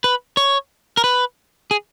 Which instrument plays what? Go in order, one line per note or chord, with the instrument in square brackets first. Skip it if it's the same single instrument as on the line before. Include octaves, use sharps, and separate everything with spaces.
[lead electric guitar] B4
C#5
A#4
B4
G#4